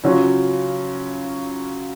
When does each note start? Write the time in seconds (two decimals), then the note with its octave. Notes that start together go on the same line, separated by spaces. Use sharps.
0.04 C#3 F#3 C#4 F4